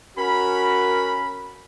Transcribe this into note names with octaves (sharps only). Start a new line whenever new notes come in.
C#4 F#4 A#4 B5